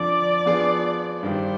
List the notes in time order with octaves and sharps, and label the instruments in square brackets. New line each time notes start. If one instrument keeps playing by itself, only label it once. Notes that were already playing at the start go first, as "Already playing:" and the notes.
Already playing: [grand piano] F2 D3 F3 [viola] D5
[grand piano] F3 B3 D4 F4 G#4
[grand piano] G2 D#3 G3 [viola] C5